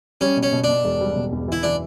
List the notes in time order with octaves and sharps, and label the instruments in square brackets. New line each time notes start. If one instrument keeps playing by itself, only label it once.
[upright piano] G3 [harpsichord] C#4
[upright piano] B2
[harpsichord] C#4
[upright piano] B2
[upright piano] B2 [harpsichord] D4
[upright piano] E1
G3
B2
E2
[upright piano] E3 [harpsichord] E4
[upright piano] E3 [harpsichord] D4